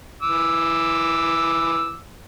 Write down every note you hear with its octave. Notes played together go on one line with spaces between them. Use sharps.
E3 D6 E6